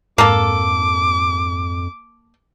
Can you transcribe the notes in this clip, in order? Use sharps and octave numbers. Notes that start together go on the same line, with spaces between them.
F2 G#2 A#3 A4 D6